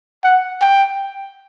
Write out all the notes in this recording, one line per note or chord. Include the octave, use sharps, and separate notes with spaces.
F#5
G5